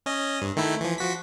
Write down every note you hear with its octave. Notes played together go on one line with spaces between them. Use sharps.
C#4 D#5
G2
D#3 A3 E4
E3 F3
F3 F#4 B6